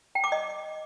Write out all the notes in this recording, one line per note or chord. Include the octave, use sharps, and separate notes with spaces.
G5
D6
D#5